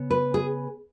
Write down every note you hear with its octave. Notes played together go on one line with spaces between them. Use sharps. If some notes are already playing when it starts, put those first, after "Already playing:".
Already playing: C#3 B3
B4
G#4